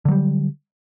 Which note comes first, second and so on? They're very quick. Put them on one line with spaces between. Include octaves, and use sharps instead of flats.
D3 F#3 G3